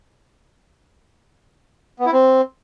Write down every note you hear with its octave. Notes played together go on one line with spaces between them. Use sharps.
B3
E4
C4